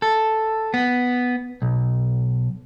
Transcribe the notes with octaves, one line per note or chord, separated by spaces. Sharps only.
A4
B3
B1